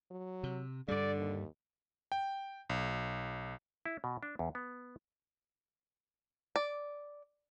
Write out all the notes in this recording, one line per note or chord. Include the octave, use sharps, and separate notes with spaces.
F#3
C3
G2 D3 G3 D5
D#2
G5
B1
E4
B2
D4
E2
B3
D5